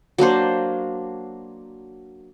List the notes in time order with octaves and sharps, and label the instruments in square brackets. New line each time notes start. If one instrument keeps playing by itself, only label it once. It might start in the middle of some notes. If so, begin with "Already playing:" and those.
[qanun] F#3 A#3 D4 C5